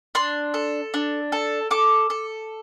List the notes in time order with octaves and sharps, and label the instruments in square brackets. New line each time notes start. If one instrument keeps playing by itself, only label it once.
[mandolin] D4 C6
A4
D4
A4
A4 D6
A4